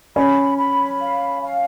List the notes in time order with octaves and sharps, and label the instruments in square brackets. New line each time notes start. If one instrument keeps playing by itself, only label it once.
[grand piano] C#4 [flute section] B5
[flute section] B5
F5
F5